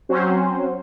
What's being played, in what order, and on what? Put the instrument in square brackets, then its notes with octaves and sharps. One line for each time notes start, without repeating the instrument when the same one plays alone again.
[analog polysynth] F#3 C4 C#4 F#4 C5